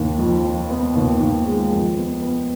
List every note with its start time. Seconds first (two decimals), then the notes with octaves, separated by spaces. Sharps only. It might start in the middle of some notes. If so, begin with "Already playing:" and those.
Already playing: D#2
0.18 F2
0.44 F3
0.70 B3
0.95 D#2
1.20 D#2
1.46 G#3
1.72 F2
1.97 B3
2.22 B3